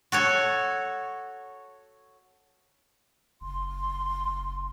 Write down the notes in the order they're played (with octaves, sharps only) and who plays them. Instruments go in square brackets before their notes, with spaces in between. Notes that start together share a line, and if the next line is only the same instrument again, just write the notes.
[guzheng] F#4 A4 C#5
[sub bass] F#1 [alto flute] C6